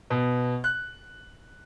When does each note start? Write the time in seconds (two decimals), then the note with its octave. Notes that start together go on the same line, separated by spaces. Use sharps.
0.10 B2
0.64 F#6